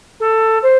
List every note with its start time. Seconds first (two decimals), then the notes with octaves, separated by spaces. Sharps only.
0.20 A4
0.62 C5